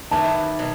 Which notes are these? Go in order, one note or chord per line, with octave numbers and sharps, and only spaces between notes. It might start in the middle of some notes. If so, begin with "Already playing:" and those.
D#3 F#3 B3 E4 G4 A5
B2 F#3